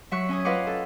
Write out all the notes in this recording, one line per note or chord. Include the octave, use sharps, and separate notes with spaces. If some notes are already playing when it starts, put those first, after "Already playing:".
F#3 E5 C#6 F#6
C#4 G#5 D#6
F4 B4 D#5 F5 F#5 D6
A4